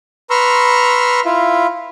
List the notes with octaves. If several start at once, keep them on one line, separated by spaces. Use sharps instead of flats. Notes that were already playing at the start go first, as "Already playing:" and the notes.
B4 A#5 C6 C#6 E6 F6
E4 F4